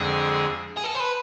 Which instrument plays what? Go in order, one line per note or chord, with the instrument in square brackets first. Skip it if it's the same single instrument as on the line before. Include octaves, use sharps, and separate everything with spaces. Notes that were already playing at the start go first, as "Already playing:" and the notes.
Already playing: [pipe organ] F2 D3 G#3 C4 [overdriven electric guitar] G#4
[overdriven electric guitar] G#4
A4
C5
B4